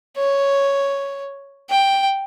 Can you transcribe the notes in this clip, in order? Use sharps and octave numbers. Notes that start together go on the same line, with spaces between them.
C#5
G5